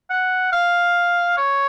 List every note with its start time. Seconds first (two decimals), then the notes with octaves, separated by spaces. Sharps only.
0.10 F#5
0.52 F5
1.37 C#5